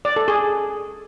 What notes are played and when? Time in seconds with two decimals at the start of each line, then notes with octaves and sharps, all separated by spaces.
0.05 D5
0.16 A4
0.28 G#4